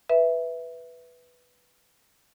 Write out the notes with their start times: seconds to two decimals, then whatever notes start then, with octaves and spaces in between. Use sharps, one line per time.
0.09 B4 E5